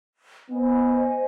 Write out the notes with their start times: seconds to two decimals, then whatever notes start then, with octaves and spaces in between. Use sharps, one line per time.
0.50 B3 C5 D#5 G#5